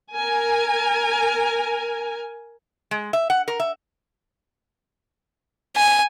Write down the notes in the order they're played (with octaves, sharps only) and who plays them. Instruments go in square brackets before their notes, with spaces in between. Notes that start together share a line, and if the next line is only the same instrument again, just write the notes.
[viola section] A#4 G#5
[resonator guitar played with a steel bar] G#3
E5
F#5
A#4
E5
[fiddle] G#5